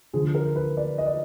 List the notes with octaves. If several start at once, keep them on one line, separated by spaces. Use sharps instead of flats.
D2 D3 F3 G#4
A#4
B4
D5
D#5
D5